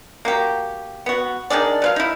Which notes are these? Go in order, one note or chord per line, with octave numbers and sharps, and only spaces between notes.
A#3 F#4 G4
B3 F#4
D#3 D4 G#4 D5
F#3 B4 F5
D#4 E4